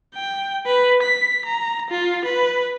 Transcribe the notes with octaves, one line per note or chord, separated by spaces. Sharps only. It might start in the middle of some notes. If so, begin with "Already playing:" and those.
G5
B4
B6
A#5
F4
B4